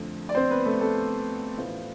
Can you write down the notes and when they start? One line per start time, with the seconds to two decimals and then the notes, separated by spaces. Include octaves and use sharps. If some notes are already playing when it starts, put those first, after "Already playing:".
Already playing: F2 D3 F3 A3
0.29 D5
0.35 C4 C5
0.50 B3 B4
0.65 A3 A4
0.81 A3 A4
1.57 A1 A2 F3 B3